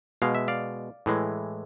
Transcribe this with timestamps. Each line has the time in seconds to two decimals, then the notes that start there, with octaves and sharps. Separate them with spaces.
0.22 B2 G#3 F5
0.35 E5
0.48 D5 F5
1.06 A2 E3 G#3